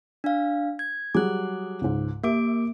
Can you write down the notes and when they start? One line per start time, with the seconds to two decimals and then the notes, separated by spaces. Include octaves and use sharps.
0.24 D4 F5
0.79 G#6
1.15 F#3 G3 G#4 D6 F#6
1.81 C#2 G#2
2.24 A#3 G4 A#4 E5 D6 D7